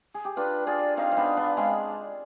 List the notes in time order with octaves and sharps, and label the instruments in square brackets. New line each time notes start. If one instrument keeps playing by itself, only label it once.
[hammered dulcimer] G#4
G4
[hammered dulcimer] D4 F4 [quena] B4
[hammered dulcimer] F4 G#4 [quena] D5
[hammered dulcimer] C4 D#4 [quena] F5
[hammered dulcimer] C4
B3 D4
B3 D4
[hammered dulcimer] G#3 C4 [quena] F5